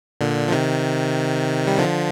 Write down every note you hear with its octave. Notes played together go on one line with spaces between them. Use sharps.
A#2 D3
F3
C3 D#3
G3
D3 F3